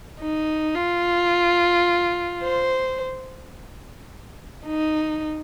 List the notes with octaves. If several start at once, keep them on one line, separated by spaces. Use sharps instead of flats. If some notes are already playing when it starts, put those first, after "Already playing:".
D#4
F4
C5
D#4